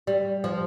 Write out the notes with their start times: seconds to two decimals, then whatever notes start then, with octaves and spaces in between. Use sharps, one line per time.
0.07 G3
0.44 F3